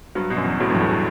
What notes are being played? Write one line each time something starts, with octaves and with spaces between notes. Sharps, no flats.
G2 F#3
B2
F#2
E2
A2 F#3
E2 G2
A2
F#3